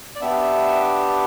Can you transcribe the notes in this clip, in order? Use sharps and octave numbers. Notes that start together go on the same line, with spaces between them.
D5
B3 D4 G4 E5